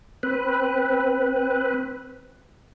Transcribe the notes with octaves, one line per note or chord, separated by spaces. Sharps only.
C4 B4